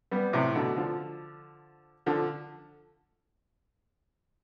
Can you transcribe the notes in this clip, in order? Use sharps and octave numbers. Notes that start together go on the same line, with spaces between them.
G3 B3
A2 C3
B2 D3
D3 F3
D3 F3